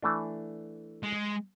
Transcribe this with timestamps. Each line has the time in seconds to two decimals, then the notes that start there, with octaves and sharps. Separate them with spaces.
0.02 E3 A3 D4
1.03 G#3